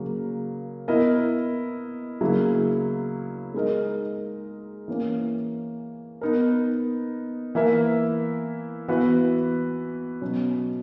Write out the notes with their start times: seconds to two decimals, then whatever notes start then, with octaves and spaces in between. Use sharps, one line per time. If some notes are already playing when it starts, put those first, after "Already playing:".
Already playing: C#3 F#3 A#3 A#4
0.88 B3 E4 A#4 D#5
2.21 C#3 F#3 A#3 E4
3.54 G#3 D#4 A#4 D#5
4.88 E3 A#3 C#4
6.21 B3 D#4 A#4
7.55 E3 A#3 E4 A#4 E5
8.88 E3 B3 F#4 B4 E5
10.21 B2 F#3 C#4